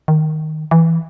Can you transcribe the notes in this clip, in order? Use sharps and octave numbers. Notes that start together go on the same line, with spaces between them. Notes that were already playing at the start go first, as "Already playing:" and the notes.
D#3
E3